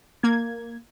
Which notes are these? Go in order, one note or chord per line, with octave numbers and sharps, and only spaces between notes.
A#3 G#6